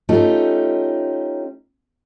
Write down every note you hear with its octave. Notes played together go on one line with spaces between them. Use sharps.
A3 C#4 D#4 F4 G4